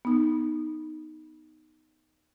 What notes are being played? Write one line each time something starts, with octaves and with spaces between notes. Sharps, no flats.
B3 D#4